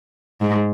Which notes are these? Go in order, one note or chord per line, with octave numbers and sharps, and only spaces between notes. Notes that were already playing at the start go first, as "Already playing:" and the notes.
G#2